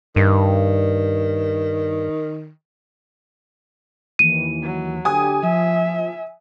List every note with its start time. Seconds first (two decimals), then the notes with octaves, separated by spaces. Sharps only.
0.16 G2 D#3
4.19 D#2 E3 D#7
4.62 F#3
5.05 D3 G4 G#5 D#6
5.43 F3 E5